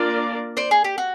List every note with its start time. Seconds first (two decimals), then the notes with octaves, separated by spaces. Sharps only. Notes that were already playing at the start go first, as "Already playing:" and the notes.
Already playing: A#3 D4 F4 A#4 D5
0.57 C5 D5
0.71 G#4
0.84 G4
0.98 F#4